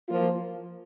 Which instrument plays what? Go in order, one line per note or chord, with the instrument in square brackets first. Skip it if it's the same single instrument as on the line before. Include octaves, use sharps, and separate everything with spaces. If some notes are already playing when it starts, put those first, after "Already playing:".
[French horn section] F3 A#3 F4